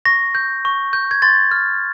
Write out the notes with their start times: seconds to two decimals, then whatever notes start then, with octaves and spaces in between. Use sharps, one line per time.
0.05 C#6 A#6
0.35 G6
0.65 C#6
0.93 G6
1.11 G#6
1.22 C6 A6
1.51 F6